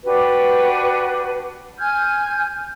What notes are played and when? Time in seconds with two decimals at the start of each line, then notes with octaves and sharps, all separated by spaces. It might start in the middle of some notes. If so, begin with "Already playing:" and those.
0.05 D4 F#4 G4 B4
1.79 G#5 F6 G6 G#6